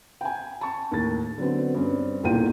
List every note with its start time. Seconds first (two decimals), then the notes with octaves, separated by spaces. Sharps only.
0.21 G5 G#5
0.61 A5 C#6
0.91 D#2 A2 A6
1.38 D3 F#3 B3 C4
1.74 G2 C4 C#4
2.23 B1 E2 A#2 F4 G5 D#7